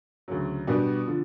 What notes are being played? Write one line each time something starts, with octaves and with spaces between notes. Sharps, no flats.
D2 C#3 F#3
B2 G3 B3 D4 F#4
D3 F3